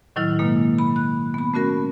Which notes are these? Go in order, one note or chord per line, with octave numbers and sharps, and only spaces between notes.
A2 D#3 F#3 E4 F6
B2 G#3 A#3
B5
F#6
B3 B5
A3 C#4 F#4 A#4